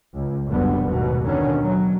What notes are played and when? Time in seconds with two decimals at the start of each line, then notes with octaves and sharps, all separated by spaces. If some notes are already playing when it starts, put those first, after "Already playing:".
0.13 C#2
0.47 F#1 C2 B2 D3 G3 B3
0.85 D#2 G#2 B2
1.25 B2 D3 D#3 C#4
1.61 F#3